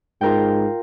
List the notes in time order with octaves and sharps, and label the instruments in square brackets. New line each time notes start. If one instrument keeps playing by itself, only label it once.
[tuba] G#2 [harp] F4 A#4 G5